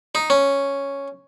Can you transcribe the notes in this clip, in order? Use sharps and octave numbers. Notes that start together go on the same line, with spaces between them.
D#4
C#4